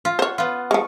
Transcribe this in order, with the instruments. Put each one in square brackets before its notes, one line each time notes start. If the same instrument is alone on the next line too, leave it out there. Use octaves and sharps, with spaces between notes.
[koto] F4
[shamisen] C5 C#5 [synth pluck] F#5
[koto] B3 F4
[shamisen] F3 G#3 [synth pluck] C#6